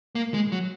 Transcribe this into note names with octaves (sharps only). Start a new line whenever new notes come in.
A#3
G#3
F#3